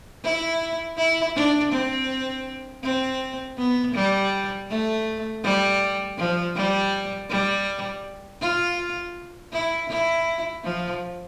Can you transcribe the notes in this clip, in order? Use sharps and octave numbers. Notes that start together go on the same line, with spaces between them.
E4
E4
D4
C4
C4
B3
G3
A3
G3
F3
G3
G3
F4
E4
E4
F3